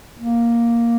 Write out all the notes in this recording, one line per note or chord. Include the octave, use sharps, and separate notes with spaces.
A#3